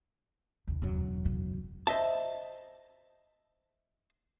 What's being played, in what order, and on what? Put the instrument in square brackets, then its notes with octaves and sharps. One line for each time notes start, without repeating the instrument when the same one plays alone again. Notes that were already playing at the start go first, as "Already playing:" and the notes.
[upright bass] D#2 C#3
[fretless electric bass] E1 F#2 F#3
[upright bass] D#2 C#3
[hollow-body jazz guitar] C5 D#5 E5 A5